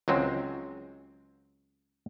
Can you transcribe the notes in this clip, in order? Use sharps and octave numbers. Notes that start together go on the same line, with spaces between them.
C#2 F#3 G#3 C4